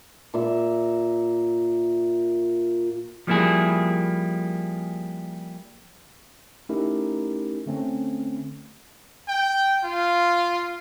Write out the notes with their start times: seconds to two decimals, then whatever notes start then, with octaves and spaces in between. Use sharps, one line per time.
0.34 A#2 E5
3.27 F3 G3 A#3 E4 G#4
6.69 A3 C#4 D#4 E4 G4 A#4
7.66 D3 A3 C4 C#4
9.28 G5
9.84 F4